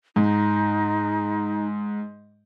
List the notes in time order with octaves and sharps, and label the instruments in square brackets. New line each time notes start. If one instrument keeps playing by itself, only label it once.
[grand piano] G#2 [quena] D#4